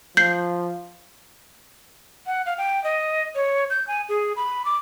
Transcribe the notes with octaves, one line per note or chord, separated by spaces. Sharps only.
F3 G6 C7
F#5
F5
G5
D#5
C#5
G6
G#5
G#4
B5
D6